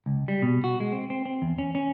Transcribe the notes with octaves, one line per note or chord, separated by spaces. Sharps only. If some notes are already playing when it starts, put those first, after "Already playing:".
C#2
G3
B2
F#4
G#3
C4
C4
C4
E2
C#4
C#4